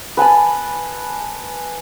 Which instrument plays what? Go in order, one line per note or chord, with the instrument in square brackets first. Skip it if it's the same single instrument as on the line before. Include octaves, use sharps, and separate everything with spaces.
[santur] B4 G#5 A5 B5